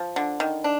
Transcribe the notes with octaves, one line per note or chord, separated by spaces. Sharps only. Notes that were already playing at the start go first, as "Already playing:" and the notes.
Already playing: F3
D3
D#3
D4